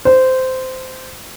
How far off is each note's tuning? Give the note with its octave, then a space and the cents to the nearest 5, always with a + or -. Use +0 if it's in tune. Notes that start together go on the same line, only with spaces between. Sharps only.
C5 -15